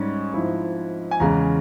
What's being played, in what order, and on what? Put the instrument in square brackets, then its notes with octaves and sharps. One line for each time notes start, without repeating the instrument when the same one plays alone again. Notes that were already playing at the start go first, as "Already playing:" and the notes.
Already playing: [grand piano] G#2 G3 C#4
G#2 F3 C4 E4
G#5
E2 C#3 E3 G#3 A#5